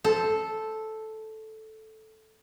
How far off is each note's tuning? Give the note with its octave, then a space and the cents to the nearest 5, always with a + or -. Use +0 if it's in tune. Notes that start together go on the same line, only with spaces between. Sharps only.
A4 -5 C5 +0